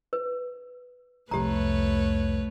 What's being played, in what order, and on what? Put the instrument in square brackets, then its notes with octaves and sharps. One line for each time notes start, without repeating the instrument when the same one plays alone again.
[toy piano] B4
[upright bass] C2 F2 [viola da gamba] A3 B4 C#5 [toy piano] G4 A#5